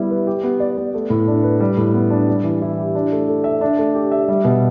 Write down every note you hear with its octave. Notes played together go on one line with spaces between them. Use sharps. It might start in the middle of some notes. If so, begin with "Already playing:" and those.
Already playing: G3 B3 E4
B4
G4
B3
D5
B3
A3
A2
D4
B4
G3
A2
B3
D4
G3
E3
E4
G4
D4
A3
A4
E5
D4
A3
G4
E5
G3
B2